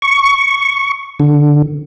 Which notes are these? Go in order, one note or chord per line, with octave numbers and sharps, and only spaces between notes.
C#6
D3